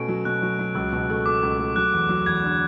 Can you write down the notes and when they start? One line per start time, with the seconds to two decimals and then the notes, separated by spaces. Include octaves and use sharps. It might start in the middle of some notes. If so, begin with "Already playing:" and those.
Already playing: B2 A3 C#4 D7
0.08 F#3
0.25 B2 F#6
0.42 F#3
0.59 F#3
0.75 C#2 E6
0.93 B2
1.10 A3
1.26 A3 D6
1.43 C#2
1.59 A3
1.76 F#3 F#6
1.93 E2
2.09 F#3
2.26 E2 G#6
2.43 D3